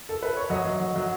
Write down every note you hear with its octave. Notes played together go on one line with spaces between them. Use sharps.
A4
B4
C#5
F#3 D#5
F#3
F#3
F#3